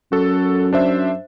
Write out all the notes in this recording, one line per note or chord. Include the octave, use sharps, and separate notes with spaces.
F#2 F#4 A4
D4 C5 E5